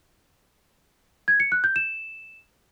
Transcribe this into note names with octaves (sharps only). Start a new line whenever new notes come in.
G#6
C#7
F#6
G6
E7